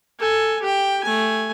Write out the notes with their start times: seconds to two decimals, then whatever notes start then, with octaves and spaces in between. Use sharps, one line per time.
0.19 A4 G#5
0.62 G4 G5
1.04 A3 G#5